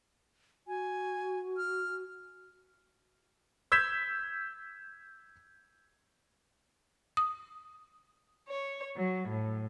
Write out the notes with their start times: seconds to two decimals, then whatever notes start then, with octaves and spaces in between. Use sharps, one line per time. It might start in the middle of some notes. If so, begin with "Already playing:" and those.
0.68 F#4 G#5
1.57 F6
3.72 E6 G6 G#6 B6 E7
7.17 D#6
8.48 C#5
8.97 F#3
9.30 A2